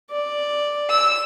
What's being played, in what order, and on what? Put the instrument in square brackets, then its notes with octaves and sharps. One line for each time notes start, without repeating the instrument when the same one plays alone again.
[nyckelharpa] D5
[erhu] E6